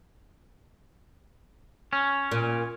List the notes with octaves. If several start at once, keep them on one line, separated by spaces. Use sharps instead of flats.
C#4
A#2